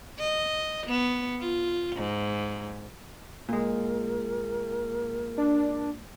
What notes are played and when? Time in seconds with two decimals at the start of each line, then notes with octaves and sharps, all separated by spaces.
0.19 D#5
0.87 B3
1.40 F4
1.96 G#2
3.49 A#2 G#3 A#4
5.38 D4